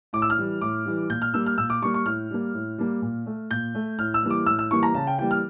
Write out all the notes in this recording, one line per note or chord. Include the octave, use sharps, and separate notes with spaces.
A2 D6
E6
F6
E3 G3
A2 D6
E3 G3
A#2 G6
F6
G3 A#3 E6
F6
A#2 E6
D6
G3 A#3 C#6
C#6
A2 F6
G3 A#3
A2
G3 A#3
A#2
A3
A#2 G6
A3
A2 F6
E6
E3 G3 A#3
D6
A2 E6
E6
E3 G3 A#3 C#6
A#5
C#3 A5
G5
E3 G3 A#3 G5
F6